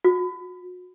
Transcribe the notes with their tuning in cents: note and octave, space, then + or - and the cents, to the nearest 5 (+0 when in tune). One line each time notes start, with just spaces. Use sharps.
F#4 -35